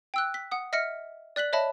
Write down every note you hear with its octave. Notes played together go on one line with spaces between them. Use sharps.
G5 E6 F#6
B6
F#5 D#6
D#5 E5 F6 A#6 B6 C#7
D5 F#6 B6 F#7
C#5 D#5 E5 A5 B5